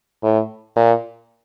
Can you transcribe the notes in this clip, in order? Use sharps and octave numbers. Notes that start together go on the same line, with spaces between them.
A2
A#2